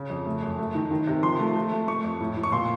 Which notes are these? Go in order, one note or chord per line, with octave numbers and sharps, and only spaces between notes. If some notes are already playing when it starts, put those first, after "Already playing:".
Already playing: C#3
F2
A3
F#2
A3
D#3
D#3
C3
F3 C6
A3
A3
A3
A3 C#6
F2
A2
A2
C#6
A#2 C6